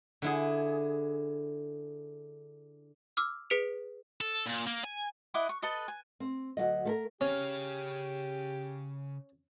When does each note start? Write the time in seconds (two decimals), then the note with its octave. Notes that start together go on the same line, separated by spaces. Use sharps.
0.22 D3 E4 G#4
3.17 D6 E6 F6
3.50 G#4 B4 B6 C#7 D7 F7
4.21 A4
4.46 A#2
4.67 A#3
4.84 G#5
5.34 E4 D#5 F#5 D6
5.49 C#6
5.62 A4 B4 D#5 A5
5.88 G#5
6.20 C4
6.57 D2 G2 F#3 D#5
6.85 A3 A4 A#4
7.21 C#3 C#4 G4 F5